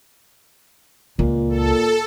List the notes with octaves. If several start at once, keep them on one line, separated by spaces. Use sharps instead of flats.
C#2 A#2
A4